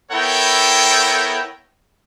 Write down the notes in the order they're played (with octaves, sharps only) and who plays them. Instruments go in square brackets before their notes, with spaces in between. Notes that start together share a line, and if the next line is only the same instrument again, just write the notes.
[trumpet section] B3 E4 A4 A#4 C#5 G5